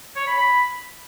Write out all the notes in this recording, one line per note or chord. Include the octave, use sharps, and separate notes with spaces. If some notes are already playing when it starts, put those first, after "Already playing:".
C#5
B5
B5